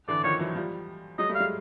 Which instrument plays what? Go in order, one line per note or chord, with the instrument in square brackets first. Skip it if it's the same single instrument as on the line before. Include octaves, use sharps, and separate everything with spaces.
[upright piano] D3 E3 [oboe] D5
[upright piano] D#3 F3 [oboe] C#5
[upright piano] E3 F#3
F3 G3
[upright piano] F#3 G#3 [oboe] D#5
[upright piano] G3 A3
[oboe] F5
[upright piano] F#3 G#3